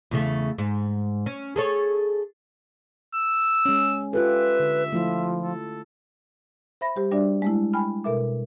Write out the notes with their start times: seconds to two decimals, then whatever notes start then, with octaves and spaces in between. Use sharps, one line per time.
0.11 E2 C#3 A3
0.58 G#2
1.26 C#4
1.56 G#4 A4 C#5
3.15 E6
3.65 G#3 C#4
4.13 F4 G4 A4 B4 E5
4.60 D3
4.92 F3 A3 E4 F4
5.42 A4
6.81 C5 E5 B5 A#6
6.96 G3 G4 C5
7.12 G3 D4 F#4 D5 E5
7.42 G#3 A3 E4
7.74 G5 G#5 B5 F6
8.04 B2 A4 A#4 E5 D6